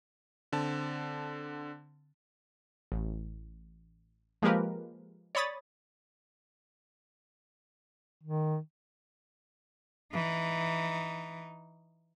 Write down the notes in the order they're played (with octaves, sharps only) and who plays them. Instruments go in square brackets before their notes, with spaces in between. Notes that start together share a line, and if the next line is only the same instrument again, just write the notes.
[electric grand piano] D3 C4 A5
[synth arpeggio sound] A1
F3 G#3 A#3 G4 A#4 B4
C#5 D5 B5 D#6 A6
[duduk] D#3
[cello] E3 D#4